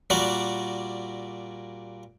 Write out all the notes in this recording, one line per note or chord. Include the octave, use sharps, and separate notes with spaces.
A#2 G3 A#3 F#4 D5 F#5